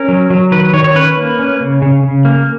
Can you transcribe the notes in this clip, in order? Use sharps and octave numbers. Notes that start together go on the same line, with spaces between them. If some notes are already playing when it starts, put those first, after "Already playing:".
Already playing: C#4 A#4
F#3
F#3
D#3 B4
D#3 C#5
C#5
C#4 B4
A#3
C#4
C#3
C#3
C#3
A#3